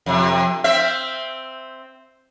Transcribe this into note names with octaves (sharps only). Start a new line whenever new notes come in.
F2 C3
C4 E5